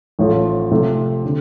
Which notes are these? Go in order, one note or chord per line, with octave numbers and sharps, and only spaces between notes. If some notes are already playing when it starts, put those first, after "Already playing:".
A1 A2 F3 A3
C3 F3 A3
D3